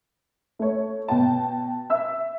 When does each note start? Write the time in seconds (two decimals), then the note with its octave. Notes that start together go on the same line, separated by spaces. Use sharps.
0.59 A3 C#5
1.08 B2 G5 A5
1.90 E5 E6